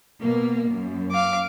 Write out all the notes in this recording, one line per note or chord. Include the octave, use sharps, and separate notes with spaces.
B2 A#3
F#2
F5 D6